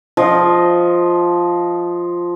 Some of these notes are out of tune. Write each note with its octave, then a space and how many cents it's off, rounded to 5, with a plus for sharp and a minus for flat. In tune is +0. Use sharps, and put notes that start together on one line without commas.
F3 +0 D#5 +5